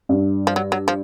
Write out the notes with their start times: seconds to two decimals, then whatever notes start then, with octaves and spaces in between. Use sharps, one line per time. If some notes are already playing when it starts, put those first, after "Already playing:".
0.09 G2
0.47 F3
0.56 F#3
0.72 F#3
0.88 F3